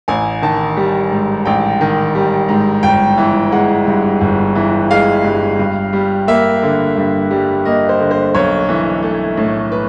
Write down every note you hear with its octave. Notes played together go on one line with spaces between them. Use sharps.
A1 G#5
D#3 A5
G3
G#2
A1 G5
D#3
G3
G#2
G1 G5
E3
G#3 F#5
G2
G1
E3
G#3 F5
G2
G2
G3
A#3 E5
D3
G2
G3
A#3 D#5
C5
D3
C5
B1 C#5
E3
A3
A2
B4